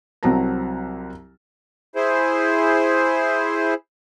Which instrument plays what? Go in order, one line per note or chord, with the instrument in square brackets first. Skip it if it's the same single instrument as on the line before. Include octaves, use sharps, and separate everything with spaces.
[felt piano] C2 F#3 C4 A5 A#5 A#6
[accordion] E4 G#4 C5